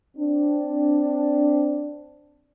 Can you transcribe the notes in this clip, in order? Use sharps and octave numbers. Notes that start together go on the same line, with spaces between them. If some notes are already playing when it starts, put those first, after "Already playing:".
C4 D4